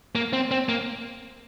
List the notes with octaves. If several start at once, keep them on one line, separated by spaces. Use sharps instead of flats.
A#3
C4
C4
A#3